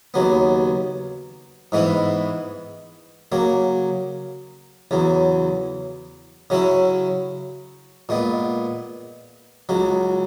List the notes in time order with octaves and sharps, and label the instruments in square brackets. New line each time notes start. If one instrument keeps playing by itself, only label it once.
[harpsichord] D#2 C#3 F#3 B3
G#2 E3 G#3 B3 E4
C#3 F#3 A#3
E2 C#3 F#3
C#3 F#3 C#4 E4
A#2 G#3 B3
C#2 C#3 F#3